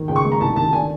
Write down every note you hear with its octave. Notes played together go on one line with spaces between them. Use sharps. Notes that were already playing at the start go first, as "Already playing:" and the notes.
Already playing: D#3
C#2 G5
C#6
G#3
A#5
C2 A5
D#3 A5
D3 G#5